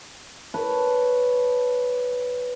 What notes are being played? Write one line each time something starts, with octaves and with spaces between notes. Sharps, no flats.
B4 C#5 A5